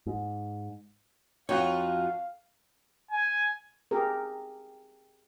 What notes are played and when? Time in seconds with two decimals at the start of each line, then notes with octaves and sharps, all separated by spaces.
0.06 G#2
1.49 F2 D#4 F4 F#4 C#5 F5
3.11 G#5
3.91 G4 G#4 A#4